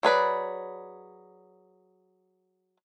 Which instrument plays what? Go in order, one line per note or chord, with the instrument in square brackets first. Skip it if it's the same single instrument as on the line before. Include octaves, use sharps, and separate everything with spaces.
[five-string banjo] F#3 G#4 B4 D5